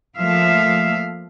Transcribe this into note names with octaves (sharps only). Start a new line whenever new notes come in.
F3 A3 A#3 E5 F5